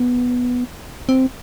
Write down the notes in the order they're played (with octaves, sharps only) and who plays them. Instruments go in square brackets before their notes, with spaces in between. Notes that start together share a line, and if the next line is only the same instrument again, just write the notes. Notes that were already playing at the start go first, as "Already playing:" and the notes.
Already playing: [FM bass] B3
C4